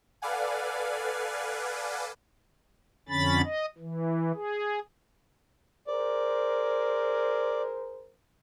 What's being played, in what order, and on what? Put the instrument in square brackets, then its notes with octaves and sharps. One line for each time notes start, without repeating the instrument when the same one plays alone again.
[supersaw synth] A4 B4 D5 F5 F#5 G#5
[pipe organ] F2 D3 C#4 B5 A6
D#5
E3
G#4
[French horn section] G#4 A#4 C5 [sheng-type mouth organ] D5